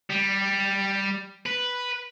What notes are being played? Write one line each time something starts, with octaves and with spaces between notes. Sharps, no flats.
G3
B4